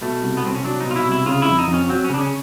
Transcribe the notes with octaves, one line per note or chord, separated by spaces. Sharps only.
B2 A3
C2
B3
C2 C4
C#4
F#3 D4
B2 D#4
F4
E4
C2
E4
C#3 F4
E4
F2
D#4
F2
C#4
F#3 C4
C#4
C#3 D4
C#4